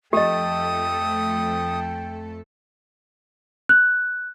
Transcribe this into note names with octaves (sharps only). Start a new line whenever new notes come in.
F2 A3 G4 A4 D#5 G5 D#6
F#6